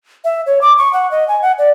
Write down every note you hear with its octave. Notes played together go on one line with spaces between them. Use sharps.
E5
C#5
D6
C#6
F#5
D#5
G#5
F#5
D5